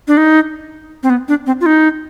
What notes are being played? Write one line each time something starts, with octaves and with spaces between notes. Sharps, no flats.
D4
D#4
C4
B3
D4
C4
F4
D#4